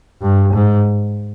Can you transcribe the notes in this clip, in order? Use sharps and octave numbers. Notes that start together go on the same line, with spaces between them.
G2
G#2